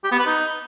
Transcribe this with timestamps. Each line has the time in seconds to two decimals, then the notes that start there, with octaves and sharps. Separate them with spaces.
0.04 G4
0.11 B3
0.19 B4
0.26 D#4